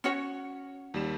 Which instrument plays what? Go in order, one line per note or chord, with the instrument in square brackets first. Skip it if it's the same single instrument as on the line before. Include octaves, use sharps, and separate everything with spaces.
[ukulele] C#4 F#4 C#5
[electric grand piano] D#2 G3 E7